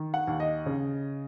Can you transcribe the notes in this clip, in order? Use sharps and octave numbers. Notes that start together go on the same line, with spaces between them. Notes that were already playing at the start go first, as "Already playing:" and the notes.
Already playing: D#3
F#5
D#2
D#5
C#3